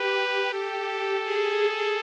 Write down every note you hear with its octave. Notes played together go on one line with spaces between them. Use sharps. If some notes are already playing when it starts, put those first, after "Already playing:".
Already playing: G4 B4
A4
G#4